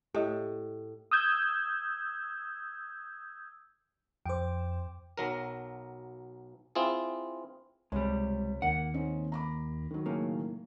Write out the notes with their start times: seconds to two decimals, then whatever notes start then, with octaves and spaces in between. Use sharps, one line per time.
0.15 A2 G4 D#5
1.11 D#6 E6 G6 G#6
4.26 F2 C5 G5 D6
5.17 B1 F#3 A#4
6.75 C4 E4 F4 G#4
7.92 C#2 C3 G3 G#3 C#5 B5
8.62 D#2 A#3 F#5
8.94 C4 C#4 D#4
9.32 A#5 B5 D6
9.91 D#3 F#3
10.06 A2 C#3 A#3